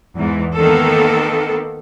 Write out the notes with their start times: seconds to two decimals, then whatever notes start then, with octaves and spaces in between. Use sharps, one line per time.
0.15 E2 G#2 E3
0.54 D#3 A#3 B3 A4